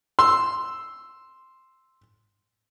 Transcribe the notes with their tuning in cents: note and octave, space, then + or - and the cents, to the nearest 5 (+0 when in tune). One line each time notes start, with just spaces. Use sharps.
C6 +0 E6 +0